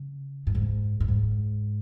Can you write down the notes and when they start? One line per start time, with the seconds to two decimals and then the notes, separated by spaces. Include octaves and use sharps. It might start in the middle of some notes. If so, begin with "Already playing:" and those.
Already playing: C#3
0.47 F#2
0.55 G#2
1.00 F#2
1.08 G#2